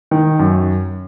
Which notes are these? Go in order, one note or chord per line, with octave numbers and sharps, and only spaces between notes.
D#3
F#2